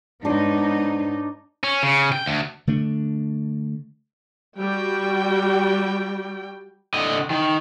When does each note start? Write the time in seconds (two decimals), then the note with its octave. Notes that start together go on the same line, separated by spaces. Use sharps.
0.25 G#2 B3 D4 D#4 C5 C#5
1.64 C#4
1.83 C#3
2.12 G5
2.26 D2
2.67 D3 A3 D4
4.57 G3 F#4 G5
6.94 D3 D#5
7.30 D#3